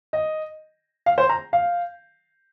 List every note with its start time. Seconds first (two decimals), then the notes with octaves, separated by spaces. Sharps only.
0.13 D#5
1.06 F5
1.18 C5
1.29 A#5
1.53 F5